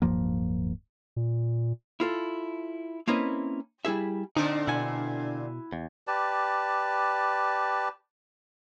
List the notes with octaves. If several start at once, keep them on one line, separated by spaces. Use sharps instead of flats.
D1 G2 F3 A#3
A#2
E4 F4 A4
A#3 C4 C#4 E4 B4 D#5
G3 E4 G#4 E5
A#2 D3 C4 D4 D#4
B2 E4 F#5 G#5
E2
G4 B4 D5 A5